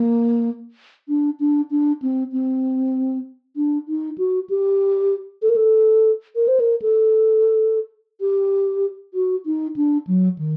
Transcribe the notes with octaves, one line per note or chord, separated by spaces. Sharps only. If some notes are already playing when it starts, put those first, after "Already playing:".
Already playing: A#3
D4
D4
D4
C4
C4
D4
D#4
F#4
G4
A4
A#4
A4
A#4
C5
A#4
A4
G4
F#4
D#4
D4
F#3
D#3